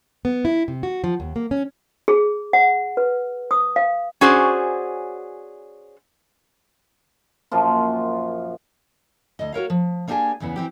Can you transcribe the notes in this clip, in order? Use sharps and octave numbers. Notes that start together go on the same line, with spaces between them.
B3
E4
C3
F#4
F3
D#2
A#3
C#4
G#4
F#5
B4
D#6
F5
C#4 F#4 G#4 C5 D5
F#2 A#2 F3 F4
D2 D#5
F#4 A#4 C#5 F5
F3
A#3 D4 D#4 G4 G#4 G#5
E2 C#3 E3 B3
E3 C4 G4